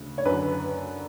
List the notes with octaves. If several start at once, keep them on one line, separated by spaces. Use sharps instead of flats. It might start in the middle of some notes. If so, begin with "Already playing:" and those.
Already playing: D2 C#3
C#5
F#2 D3 F#3 B4